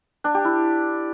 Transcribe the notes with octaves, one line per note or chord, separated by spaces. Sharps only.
D4
G4
E4